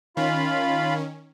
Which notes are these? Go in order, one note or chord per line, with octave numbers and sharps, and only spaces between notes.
D#3 C#4 F4 F5 B5